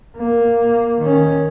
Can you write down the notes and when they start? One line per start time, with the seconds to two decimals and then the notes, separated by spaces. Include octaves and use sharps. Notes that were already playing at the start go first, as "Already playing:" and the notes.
0.17 A#3
1.00 D#3 C#4